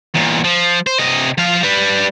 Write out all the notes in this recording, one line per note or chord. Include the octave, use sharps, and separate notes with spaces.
E2 A#2
F3
C5
C3 D#5
F3 F5
G3 B4